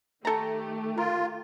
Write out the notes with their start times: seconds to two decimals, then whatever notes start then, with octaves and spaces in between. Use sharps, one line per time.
0.25 D#3 A3 G4 A4 A#5
0.98 F4 A#4